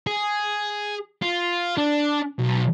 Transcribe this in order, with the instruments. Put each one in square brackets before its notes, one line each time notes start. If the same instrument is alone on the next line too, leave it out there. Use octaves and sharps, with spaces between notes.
[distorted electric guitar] G#4
F4
D4
B1